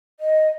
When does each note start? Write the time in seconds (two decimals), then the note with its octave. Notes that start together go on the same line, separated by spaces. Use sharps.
0.20 D#5